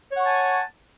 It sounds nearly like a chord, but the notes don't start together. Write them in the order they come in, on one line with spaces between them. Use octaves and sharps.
C#5 F#5 C#6 A5 G#5